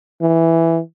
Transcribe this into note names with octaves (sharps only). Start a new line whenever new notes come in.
E3